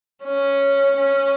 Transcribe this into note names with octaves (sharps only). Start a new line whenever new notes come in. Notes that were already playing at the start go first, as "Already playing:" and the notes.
C#4
C#4